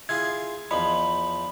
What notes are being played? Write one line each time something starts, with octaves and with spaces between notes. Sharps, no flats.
E4 F4 G#4 G#6
E2 F3 D#4 B5